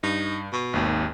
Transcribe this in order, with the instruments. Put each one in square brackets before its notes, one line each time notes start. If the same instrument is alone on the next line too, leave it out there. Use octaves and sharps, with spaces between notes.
[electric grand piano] G2 [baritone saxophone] D#4
[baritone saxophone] B2
[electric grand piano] G#1 D#2